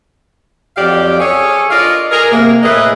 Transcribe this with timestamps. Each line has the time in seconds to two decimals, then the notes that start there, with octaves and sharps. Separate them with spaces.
0.77 F2 F#3 G4 D5 F5
1.20 G#4 A4 C#5
1.71 F4 A#4 D5 D#5 F5
2.12 G#4 A#4
2.32 C3 A#3
2.63 A2 E3 G#4 B4 D#5